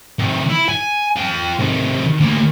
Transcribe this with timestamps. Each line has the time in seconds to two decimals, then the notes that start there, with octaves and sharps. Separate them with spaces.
0.19 C3 D#3
0.49 E4
0.69 G#5
1.16 F4 G5
1.59 C3 D#3
2.20 D2 A#3